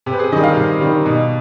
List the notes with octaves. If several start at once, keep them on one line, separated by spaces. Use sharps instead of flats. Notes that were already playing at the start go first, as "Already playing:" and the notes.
C3 G4
B4
G#4
D#3 G3 D#5
F5
C3
D#3 G3
B2